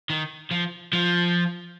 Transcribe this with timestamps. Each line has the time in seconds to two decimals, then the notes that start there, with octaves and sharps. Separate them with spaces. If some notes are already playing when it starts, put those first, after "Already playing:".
0.10 D#3
0.51 F3
0.93 F3